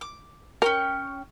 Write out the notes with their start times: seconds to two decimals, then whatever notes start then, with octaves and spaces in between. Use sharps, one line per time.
0.01 D6
0.62 C#4 A#4 G5 C#6